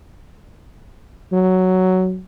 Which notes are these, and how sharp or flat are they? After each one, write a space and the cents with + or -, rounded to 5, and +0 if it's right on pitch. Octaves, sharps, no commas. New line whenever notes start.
F#3 +5